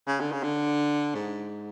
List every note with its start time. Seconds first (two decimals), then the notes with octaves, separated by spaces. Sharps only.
0.08 C#3
0.20 D3
0.32 C#3
0.43 D3
1.15 G#2